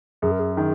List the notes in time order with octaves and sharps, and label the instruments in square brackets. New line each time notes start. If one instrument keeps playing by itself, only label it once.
[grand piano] F#2 [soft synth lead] G#4
[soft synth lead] A#4
G#4
[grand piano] D#3 [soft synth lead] G#4